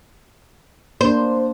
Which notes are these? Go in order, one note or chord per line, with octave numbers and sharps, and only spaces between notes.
A#3 D4 C5